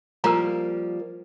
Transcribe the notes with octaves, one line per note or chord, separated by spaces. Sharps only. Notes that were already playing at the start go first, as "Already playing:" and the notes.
F3 G3 A#3 A#5 E6